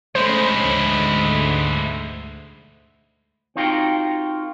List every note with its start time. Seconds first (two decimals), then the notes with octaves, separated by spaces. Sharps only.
0.15 G#3 A3 C#4 E4 C5
0.60 D2 G#2 D3
3.56 C4 D#4 F4 F#4 A#4 G5